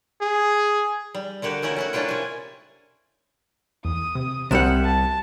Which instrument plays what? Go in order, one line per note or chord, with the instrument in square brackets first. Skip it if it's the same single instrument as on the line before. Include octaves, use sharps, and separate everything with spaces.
[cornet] G#4
[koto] G3
D3 A#3 F#4 G4
A3 C#4 E4 F#4 A#4
C#4 E4 F#4
A#3 C#4 D4 E4 F4 G5
C3 G#5
[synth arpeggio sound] E2 [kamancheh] D#6
[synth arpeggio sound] C3
[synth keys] C2 [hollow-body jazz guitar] C3 G3 F#5 [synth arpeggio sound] D5 E7
[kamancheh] A5